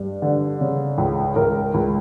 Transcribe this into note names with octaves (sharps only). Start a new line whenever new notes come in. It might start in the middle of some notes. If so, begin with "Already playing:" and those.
Already playing: G2
D3
C#3
C#2
C#2 A#4
C#2